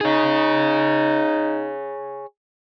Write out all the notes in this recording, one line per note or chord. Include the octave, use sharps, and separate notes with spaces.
D#4 G#4 C#5